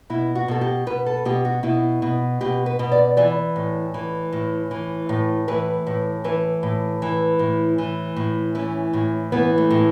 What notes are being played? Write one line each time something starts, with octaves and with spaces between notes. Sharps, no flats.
B2 E4
F#4
B2 A4
G4
B2 B4
A4
B2 G4
F#4
B2 E4
B2
B2 G4
B4
B2
D5
E3 D5
A2
E3
A2
E3
A2
E3 B4
A2
E3 B4
A2
E3
A2
E3
A2
E3 C#4
A2
E3 B3
A3
A2